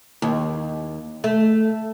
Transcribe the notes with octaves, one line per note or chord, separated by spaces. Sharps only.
D#2
A3